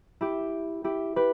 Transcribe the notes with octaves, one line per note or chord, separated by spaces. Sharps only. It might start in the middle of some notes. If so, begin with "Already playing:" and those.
E4 G4
E4 G4
G4 B4